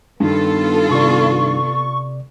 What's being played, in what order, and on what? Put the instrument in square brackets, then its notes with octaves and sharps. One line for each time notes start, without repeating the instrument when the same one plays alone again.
[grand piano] G2 D#3 [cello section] B3 F4 A4
[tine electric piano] C3 D5 [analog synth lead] C#6